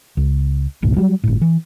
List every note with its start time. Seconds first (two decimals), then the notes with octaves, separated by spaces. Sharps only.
0.17 C#2
0.82 F#1 C#2 G#2 B2
0.97 F#3 G3
1.24 G1 A2
1.42 E3